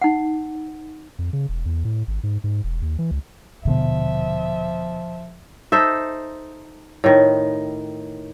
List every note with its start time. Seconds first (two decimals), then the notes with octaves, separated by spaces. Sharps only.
0.02 D#4 F#5
1.19 F2
1.33 C#3
1.49 E1
1.66 E2
1.85 A2
2.08 G#1
2.23 G#2
2.44 G#2
2.64 E1
2.82 D#2
2.99 E3
3.11 C#2
3.65 D#1 B2 D3 F3 B3 E5
5.72 D#4 A4 C5 E5
7.04 A2 D#3